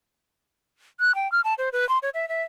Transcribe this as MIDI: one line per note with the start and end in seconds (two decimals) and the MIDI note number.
1.00 1.14 90
1.15 1.30 79
1.32 1.41 89
1.44 1.54 81
1.58 1.69 72
1.72 1.87 71
1.89 1.98 84
2.02 2.09 73
2.14 2.28 76
2.29 2.42 76